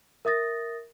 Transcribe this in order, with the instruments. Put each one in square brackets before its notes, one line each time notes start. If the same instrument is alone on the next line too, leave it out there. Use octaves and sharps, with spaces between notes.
[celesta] A#4 E5 D#6 A6 A#6